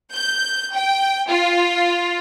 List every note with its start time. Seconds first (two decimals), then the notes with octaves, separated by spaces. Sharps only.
0.13 G6
0.73 G5
1.29 F4